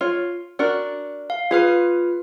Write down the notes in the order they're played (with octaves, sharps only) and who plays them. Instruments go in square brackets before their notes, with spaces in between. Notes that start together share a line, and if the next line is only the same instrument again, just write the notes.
[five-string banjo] F4 C#5
D4 F#4 A#4
[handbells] F5
[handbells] F4 B4 F6 [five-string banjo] G#4